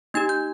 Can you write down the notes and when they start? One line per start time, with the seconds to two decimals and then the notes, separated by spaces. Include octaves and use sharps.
0.14 A#3 D#4 G4 G#6
0.29 G6